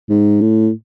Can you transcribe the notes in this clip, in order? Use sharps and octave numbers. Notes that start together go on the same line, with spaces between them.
G#2
A2